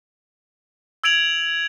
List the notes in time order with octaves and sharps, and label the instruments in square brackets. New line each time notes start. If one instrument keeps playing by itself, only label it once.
[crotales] E6 G#6 D7 F7 F#7